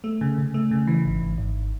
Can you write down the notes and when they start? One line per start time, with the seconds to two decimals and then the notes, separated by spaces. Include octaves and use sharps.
0.04 A3
0.21 C#3
0.38 C#3
0.54 A3
0.71 C#3
0.87 E3
1.05 G#1
1.21 G#1
1.38 G#1